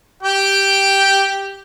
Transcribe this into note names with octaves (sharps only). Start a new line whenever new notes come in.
G4 G5